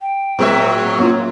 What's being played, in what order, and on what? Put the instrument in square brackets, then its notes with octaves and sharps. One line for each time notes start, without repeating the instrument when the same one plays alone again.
[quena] G5
[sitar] A2 E5 [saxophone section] F#3 [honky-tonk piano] G#3 C4
[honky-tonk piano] A#3 C#4 F4 [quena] C#5